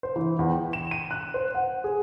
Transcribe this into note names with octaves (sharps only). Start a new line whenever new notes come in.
C5
E3
E2
G5
E7
D#7
F#6
C5
F#5
G#4